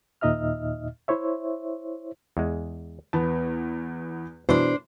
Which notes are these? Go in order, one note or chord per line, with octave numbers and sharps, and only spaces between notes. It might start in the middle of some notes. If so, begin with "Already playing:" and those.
D#2 A#2 D#4 D#5 E5 F6
E4 C5 C#5 E5
E2 G#3
E2 B3 A5
B2 E3 D4 C5